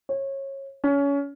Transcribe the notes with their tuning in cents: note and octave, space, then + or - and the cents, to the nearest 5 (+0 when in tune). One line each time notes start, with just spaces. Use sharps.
C#5 -25
C#4 +25